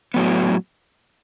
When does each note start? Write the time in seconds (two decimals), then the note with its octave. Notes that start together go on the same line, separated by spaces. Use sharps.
0.14 A2 F#3 B3